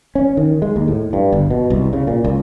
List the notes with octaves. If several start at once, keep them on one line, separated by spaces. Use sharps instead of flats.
C#4
D#3
G#3
D#2
A2
G2
G1
B2
C2
C#3
A#2
C#2